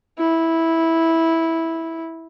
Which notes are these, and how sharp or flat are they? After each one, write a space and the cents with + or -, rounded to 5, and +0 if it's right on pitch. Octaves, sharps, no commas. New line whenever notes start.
E4 -10